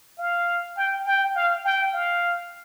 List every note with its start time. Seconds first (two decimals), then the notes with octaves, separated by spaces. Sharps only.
0.18 F5
0.77 G5
1.06 G5
1.35 F5
1.64 G5
1.93 F5